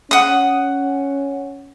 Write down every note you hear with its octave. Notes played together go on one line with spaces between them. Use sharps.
C#4 F#5 D#6